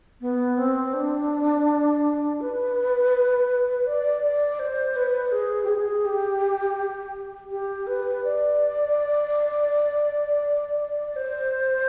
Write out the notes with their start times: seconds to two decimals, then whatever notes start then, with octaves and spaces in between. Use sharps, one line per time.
0.21 B3
0.58 C4
0.94 D4
2.41 B4
3.87 D5
4.23 D5
4.59 C5
4.96 B4
5.32 G#4
5.64 G4
5.68 G#4
6.05 G4
7.51 G4
7.87 B4
8.24 D5
11.16 C5